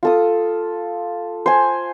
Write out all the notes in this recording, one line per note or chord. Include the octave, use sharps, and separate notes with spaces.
F4 A4 D#6
C5 G#5